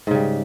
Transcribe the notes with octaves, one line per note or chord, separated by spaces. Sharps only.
G#2 C#3 G3